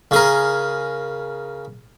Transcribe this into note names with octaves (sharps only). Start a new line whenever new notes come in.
C#3 G#4 A#4